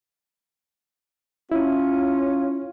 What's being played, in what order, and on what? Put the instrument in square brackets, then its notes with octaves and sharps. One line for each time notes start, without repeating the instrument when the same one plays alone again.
[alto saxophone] C#4 [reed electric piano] E4 [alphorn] F4